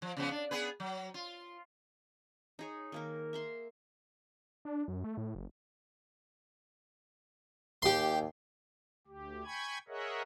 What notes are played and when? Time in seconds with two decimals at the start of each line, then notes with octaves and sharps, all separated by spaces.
0.02 F3
0.17 C#3 F3 B3
0.31 D4
0.51 B3 G#4 B4
0.80 F#3
1.14 F4
2.59 D#4 G#4 C#5
2.92 D#3 A#3 A#4
3.33 E5 A#5 C6
4.65 D4
4.88 F#2
5.04 A3
5.17 A2
5.35 F#1
7.82 D#2 G4 C6
9.07 D2 G4
9.45 G5 G#5 B5 C#6 G#6
9.88 G#4 A#4 C#5 D#5 E5 F#5